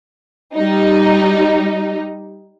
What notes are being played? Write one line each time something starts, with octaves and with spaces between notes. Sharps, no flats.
G3 D#4